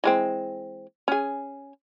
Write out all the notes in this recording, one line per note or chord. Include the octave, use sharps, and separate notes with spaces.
E3 G#3 C4
C#4 G#4